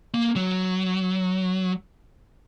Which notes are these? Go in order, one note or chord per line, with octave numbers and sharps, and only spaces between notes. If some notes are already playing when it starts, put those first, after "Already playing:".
A#3
F#3